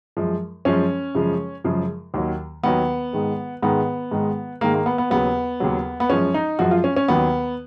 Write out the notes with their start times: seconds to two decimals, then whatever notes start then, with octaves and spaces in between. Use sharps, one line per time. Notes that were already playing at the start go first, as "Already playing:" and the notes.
0.17 F#2 F3 G#3
0.65 F#2 F3 G#3 C#4
1.15 F#2 C#3 F3 G#3
1.64 F#2 C#3 F3 G#3
2.14 D#2 D#3 F#3
2.63 D#2 D#3 F#3 B3
3.13 G#2 D#3 G#3
3.63 G#2 D#3 G#3 B3
4.11 G#2 D#3 G#3
4.61 G#2 D#3 G#3 A#3
4.74 A#3
4.86 B3
4.98 B3
5.10 D#2 C#3 F#3 B3
5.60 D#2 C#3 F#3
6.00 B3
6.10 F#2 F3 G#3 C#4
6.34 D#4
6.59 F#2 F3 G#3 F#4
6.71 F4
6.84 C#4
6.96 C#4
7.08 D#2 D#3 F#3 B3